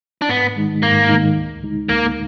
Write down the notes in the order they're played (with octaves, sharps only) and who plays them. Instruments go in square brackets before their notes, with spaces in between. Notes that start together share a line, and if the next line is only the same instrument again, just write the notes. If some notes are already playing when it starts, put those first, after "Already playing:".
[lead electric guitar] D4
[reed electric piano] G#2 [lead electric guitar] B3
[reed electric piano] D#3 G#3 D#4
[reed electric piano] G#2 [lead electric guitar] A#3
[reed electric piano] D#3 G#3 D#4
D2
D3 G#3 D#4
[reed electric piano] D2 [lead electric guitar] A#3